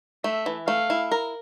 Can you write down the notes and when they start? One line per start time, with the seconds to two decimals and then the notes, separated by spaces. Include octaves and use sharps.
0.24 A3 E5
0.46 E3
0.68 A3 F5
0.90 E4
1.12 A#4